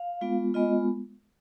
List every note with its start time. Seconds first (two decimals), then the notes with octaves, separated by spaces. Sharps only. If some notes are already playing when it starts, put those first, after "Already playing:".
Already playing: F5
0.21 G#3 B3 F4
0.54 G#3 B3 F4 D#5